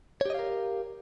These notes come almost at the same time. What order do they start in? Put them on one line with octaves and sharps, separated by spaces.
C#5 G4 D#5 F5 A#4